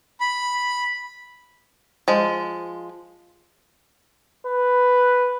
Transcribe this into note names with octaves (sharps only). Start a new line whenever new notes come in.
B5
F3 G#3
B4